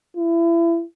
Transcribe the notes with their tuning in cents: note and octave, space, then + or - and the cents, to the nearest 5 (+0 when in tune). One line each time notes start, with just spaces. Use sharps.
E4 +30